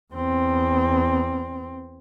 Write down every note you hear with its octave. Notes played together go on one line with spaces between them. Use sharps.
E2 C4